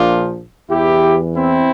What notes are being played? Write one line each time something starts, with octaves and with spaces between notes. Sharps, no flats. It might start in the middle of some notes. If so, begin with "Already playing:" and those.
Already playing: A#1 A#2 F3 D4 F4
E2 E3 E4 G4
C4 E4